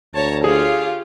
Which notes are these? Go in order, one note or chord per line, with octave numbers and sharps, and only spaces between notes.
D2 C#5 A5 A#5
F4 G4 G#4 C#5 F5